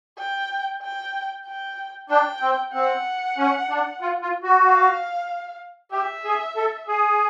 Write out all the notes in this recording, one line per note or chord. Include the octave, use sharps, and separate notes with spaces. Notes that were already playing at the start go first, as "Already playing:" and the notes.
G5
G5
G5
D4 G5
C4
C4 F#5
C#4
D4
F4
F4
F#4
F5
G4 E5
G#4
A4
G#4